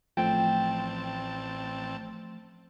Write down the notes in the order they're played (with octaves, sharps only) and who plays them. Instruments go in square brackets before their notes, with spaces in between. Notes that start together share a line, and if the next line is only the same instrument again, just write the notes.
[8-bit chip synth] A1 C4 A5 [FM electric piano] F3 A3 [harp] G5